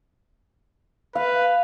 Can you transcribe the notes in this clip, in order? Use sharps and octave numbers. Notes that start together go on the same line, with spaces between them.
B4 F5